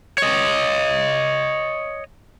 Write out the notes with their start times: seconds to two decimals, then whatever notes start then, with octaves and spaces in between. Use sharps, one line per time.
0.18 C#5 D#5